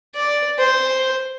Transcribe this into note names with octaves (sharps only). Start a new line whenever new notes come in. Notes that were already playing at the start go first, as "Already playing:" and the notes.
D5
C5